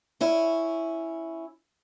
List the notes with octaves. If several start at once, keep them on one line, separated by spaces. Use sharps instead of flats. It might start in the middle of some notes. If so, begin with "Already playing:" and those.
C#4 E4